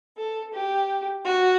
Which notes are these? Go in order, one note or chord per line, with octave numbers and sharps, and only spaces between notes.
A4
G4
F#4